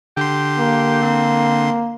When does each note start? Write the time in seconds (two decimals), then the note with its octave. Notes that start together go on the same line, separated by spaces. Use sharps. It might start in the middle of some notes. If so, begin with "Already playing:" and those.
0.17 D3 G4 C6
0.59 A#3
1.03 C4